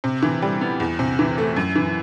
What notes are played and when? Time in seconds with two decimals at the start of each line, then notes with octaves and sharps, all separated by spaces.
0.04 C3
0.23 E3
0.42 G3
0.61 B3
0.80 E2
0.99 C3
1.19 E3
1.38 A3
1.56 F#2
1.76 E3